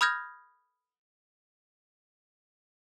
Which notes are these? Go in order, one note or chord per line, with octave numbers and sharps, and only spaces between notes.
B5 D#6 F6 G6 G#6 A#6